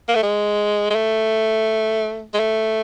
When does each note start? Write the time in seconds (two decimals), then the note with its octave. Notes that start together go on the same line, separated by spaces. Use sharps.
0.09 A#3
0.15 A3
0.23 G#3
0.90 G#3
0.95 A3
2.34 G#3
2.39 A3